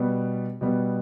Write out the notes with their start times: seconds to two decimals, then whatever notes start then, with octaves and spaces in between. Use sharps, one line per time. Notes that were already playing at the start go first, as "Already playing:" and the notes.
Already playing: B2 G3 B3
0.61 B2 G3 B3